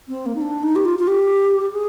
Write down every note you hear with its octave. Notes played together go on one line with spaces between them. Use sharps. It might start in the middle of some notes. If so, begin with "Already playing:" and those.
C4
A#3
D#4
D4
D#4
G4
F4
F4
G4
G#4